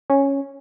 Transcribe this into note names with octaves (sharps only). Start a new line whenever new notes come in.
C#4